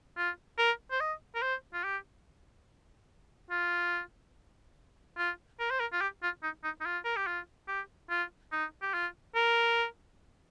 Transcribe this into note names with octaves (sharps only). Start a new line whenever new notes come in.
F4
A#4
C5
D#5
A#4
C5
F4
G4
F4
F4
A#4
C5
A#4
F4
G4
F4
D#4
D#4
D#4
F4
A#4
G4
F4
G4
F4
D#4
G4
F4
A#4